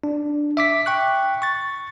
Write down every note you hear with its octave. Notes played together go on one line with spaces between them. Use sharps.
D4
E5 D6 B6
G5 C#6 F#6
C#6 A6